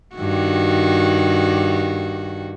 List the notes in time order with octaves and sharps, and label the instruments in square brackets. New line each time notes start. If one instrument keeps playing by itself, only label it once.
[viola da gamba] G2 D#3 F#4